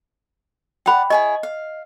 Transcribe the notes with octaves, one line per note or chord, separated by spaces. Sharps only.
D5 F#5 G5 B5
E4 G#4 C#5 D#5
F5